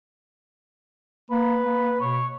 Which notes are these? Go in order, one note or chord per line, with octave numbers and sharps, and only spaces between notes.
A#3 B4
A#3
B2 C#5